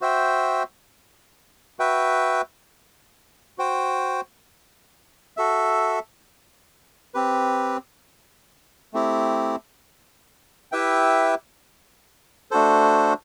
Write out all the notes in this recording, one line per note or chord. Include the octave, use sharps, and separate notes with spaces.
F#4 C5 E5 G5
F#4 B4 E5 G5
F#4 C5 G5
F#4 A4 E5
C4 G4 B4
A3 C4 E4 G4
E4 G4 B4 E5 G5
A3 D4 F#4 A4 C5